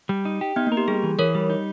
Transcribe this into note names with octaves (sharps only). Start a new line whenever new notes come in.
G3
D#4
G4
B3 D#4
A#3
A#4
G4
G3 G#4
E3
E3 A#4 C#5
G3
D#4